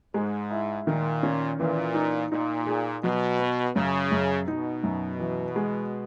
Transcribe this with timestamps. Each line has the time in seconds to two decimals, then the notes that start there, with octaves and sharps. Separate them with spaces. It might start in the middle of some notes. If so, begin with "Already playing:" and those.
0.14 G#2 G#3
0.51 E4
0.87 A#2 D#3
1.23 C#4
1.59 A#2 E3
1.94 D#4
2.31 A#2 D#4
2.67 G#4
3.03 B2 F#3
3.39 B3
3.75 F#2 C#3
4.11 F#2
4.47 B2 D#4
4.83 F#2
5.19 E3
5.56 G#3